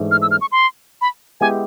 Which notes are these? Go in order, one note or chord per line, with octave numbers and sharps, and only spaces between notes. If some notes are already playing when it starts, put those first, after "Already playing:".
Already playing: G#2 E3 A3 D4
F6
E6
F6
C#6
C6
B5
G#3 B3 E4 G4 G#5